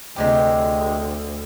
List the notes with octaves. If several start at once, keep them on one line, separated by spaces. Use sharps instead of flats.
D2 C3 G#3 G4